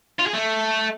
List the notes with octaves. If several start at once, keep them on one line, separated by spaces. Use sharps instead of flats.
F4
G#4
A3